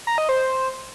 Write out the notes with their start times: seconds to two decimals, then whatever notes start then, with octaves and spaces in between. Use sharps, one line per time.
0.07 A#5
0.18 D#5
0.29 C5